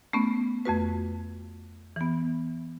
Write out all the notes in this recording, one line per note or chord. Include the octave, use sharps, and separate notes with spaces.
A3 B3 C#4
F2 A3 F#4 B4
E3 B3